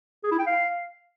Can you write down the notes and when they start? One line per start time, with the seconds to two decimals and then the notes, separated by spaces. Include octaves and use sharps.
0.24 G#4
0.31 E4
0.39 G5
0.47 F5